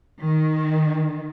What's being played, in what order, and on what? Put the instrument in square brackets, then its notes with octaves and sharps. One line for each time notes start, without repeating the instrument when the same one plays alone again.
[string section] D#3